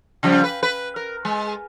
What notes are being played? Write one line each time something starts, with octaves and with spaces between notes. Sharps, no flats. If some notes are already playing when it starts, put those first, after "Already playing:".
C#3 F3 G3
B4
B4
A#4
G#3